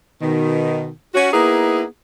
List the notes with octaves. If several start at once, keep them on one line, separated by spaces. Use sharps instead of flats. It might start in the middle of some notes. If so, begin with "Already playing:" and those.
B2 D#3
C#4 F#4
A#3 B3 D#4 E4 G#4